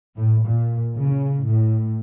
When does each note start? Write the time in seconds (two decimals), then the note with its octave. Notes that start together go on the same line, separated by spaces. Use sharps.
0.16 A2
0.46 A#2
0.96 C#3
1.44 A2